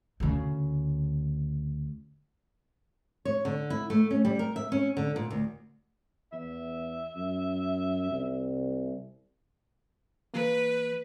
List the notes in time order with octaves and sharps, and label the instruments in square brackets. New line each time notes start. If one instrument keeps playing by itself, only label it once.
[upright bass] D2 C#3
[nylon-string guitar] C#5
D3
E4
A3
C#4
G3
A#4
E5
C#4
D3
A#2
D2
[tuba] E2 [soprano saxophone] E5
[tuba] F#2
C2
[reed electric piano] E3 A#3 [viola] B4